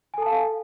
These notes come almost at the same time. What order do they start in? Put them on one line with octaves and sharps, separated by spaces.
G#5 A4 A5 F5